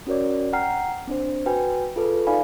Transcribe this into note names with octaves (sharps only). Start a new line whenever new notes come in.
C#4 F#4 A#4 C#5 D5
F#5 G5 A#5 F6 C7
C4 D4 C5
F#4 B4 G5 G#5
F4 G#4 A4 B4
D#4 D5 F5 G#5 B5